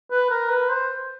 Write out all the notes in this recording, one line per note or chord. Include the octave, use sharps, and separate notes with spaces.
B4
A#4
B4
C5